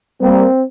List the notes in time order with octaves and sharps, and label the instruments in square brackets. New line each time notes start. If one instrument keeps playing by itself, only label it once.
[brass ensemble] G3 A#3 [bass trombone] C4